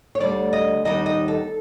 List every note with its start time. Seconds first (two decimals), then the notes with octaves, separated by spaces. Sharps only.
0.15 C#5
0.20 D2 D3 G3 D5
0.53 D#5
0.85 D#2 D#3 G3 B3 D#4 D#5
1.06 D#5
1.28 A4